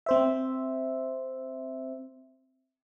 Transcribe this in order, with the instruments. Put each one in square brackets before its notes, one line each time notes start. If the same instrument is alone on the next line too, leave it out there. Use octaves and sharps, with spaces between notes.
[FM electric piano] C4 C5 E5